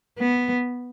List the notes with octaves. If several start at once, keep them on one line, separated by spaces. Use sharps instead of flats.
B3